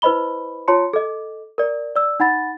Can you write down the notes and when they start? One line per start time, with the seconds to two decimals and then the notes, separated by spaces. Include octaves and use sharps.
0.02 E4 B4 C5 D#5 B5 G7
0.68 F4 C#5 A5 C6 C#7
0.93 A4 D#5
1.58 A#4 D5
1.96 D5 E6
2.20 D#4 F#5 B5 A6